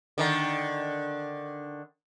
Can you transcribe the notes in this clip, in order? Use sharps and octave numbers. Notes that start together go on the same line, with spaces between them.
D3 D#3